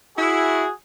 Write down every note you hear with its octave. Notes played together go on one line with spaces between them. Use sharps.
E4 F#4 G#4